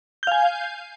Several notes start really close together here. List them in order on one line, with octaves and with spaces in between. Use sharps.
G6 F5 G#5